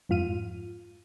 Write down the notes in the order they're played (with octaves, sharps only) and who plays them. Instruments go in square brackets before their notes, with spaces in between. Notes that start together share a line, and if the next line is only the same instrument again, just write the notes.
[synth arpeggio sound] F2 G#2 F4 F6 D#7